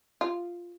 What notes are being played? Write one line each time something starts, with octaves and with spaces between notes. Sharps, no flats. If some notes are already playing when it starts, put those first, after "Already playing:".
F4